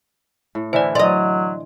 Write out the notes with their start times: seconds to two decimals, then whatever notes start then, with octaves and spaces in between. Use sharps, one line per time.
0.55 A2
0.73 D3 E3 E4 C5 D5
0.95 F#3 D5 D#5 C6